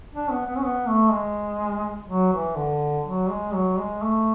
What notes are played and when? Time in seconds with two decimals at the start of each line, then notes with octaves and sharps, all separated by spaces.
0.14 D4
0.31 B3
0.47 B3
0.56 C#4
0.63 B3
0.88 A3
1.11 G#3
2.09 F#3
2.33 E3
2.56 D3
3.05 F#3
3.29 G#3
3.53 F#3
3.78 G#3
4.03 A3